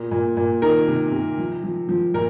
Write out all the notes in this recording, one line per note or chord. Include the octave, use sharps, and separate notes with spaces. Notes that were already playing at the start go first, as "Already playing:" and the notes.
Already playing: A#2
A#2
A#2
D#3 A#4
C3
C3
F3
F3
F3
A#2 A#4